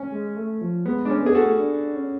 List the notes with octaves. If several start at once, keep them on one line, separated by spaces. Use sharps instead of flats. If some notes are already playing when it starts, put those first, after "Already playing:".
Already playing: C#4
G#3
A3
F3
G#3 B3
G#3 D4
C#4
B3 G#4
F#4 A4
A3
D4
C#4